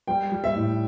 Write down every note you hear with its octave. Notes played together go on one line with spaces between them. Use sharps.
G3 G5
G3
E5
A2